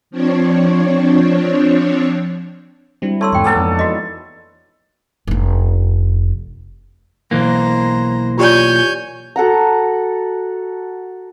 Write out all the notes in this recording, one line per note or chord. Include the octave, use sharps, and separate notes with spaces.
F3 C4 D4 C#5
G3 C4 D4 E4 F#4
A3 C#5 D5 C6 E6
E2 G#2 C3 G5 C6
E3 G#3 A#3 B3 A4 G#5 A5
F2 D#4 D5
E4 F#4 B4 D#5
F1 D4
B1 E3 A#3 C5 A#5
F4 G4 C#5 D5 G#5 G6
F#4 A4 F#5 A#5